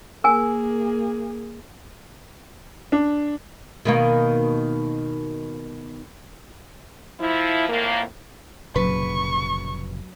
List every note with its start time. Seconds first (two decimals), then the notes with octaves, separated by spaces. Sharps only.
0.24 A#3 G#4 A#4 G#5
2.92 D4
3.85 B2 D#3 A#3
7.20 F3 E4
7.69 F2 A2 A#3
8.76 F1 A#2 C#3 F#3 B4 C#6